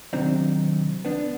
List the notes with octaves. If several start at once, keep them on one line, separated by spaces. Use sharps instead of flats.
C3 D#3 F#3 C4 D4 D#4
B3 D4